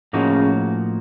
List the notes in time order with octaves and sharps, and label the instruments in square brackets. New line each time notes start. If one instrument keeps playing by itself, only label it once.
[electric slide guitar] A2 F3 A#3 D#4 F#4 [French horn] C#3